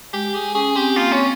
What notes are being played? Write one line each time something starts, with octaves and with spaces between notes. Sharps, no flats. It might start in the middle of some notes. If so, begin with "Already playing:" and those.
G#3 G4
G#4
C#4 G#4
C4 G4
A#3 F4
C4 C#4